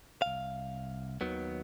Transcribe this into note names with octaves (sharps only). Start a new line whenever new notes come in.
C2 F5
D#2 D#3 F#3 B3